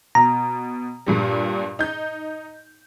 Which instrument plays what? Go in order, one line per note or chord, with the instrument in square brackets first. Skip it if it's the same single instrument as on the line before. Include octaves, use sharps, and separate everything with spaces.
[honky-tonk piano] B2 [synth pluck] A#5
[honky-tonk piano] G2 A#2 G3
D#4 G6